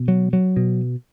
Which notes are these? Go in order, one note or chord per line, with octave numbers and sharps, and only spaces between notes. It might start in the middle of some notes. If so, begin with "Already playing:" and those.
Already playing: B2
F#3
F#3
B2